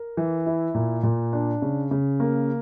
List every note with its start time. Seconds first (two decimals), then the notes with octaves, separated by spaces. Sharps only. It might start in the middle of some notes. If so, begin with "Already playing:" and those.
Already playing: A#4
0.17 E3
0.46 E4
0.75 A#2
1.03 A#2
1.33 D4
1.62 C#3
1.91 C#3
2.20 A#3